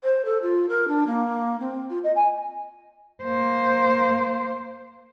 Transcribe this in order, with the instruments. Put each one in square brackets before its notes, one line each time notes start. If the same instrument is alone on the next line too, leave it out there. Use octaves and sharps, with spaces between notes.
[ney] C5
A4
F4
A#4
D4
A#3
C4
F4
D#5
G#5
[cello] A#3 C5